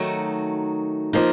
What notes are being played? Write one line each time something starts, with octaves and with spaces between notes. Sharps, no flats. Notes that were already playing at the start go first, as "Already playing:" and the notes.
Already playing: D#3 F#3 A3 D#4 F#4
F3 A#3 D#4